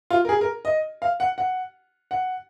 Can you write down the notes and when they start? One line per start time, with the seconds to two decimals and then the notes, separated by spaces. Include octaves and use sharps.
0.10 F4
0.25 A#4
0.29 G#4
0.41 A#4
0.65 D#5
1.02 F5
1.20 F#5
1.38 F#5
2.11 F#5